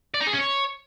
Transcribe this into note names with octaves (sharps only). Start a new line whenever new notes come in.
D5
D#4
G#4
C#4
C#5